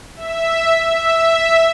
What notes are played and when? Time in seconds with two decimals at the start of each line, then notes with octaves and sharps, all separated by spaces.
0.16 E5
0.87 E5